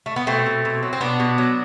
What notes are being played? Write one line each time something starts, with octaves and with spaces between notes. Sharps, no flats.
A3
B3
B2 A3 C4
B2
B2
F#3
C4
B2 B3 D4
B2
F#3